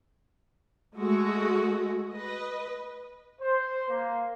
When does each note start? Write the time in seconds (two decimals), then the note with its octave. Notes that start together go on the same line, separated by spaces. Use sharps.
0.98 G#3 A3 F#4
2.12 B4 D#5
3.41 C5
3.88 A#3